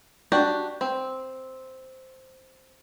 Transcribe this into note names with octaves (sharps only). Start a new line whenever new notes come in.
D4 F#4 G4
C4